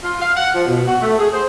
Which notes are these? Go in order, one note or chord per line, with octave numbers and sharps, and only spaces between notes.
F4
F5
F#5
F3
B2
F#4
A3
G#4
C5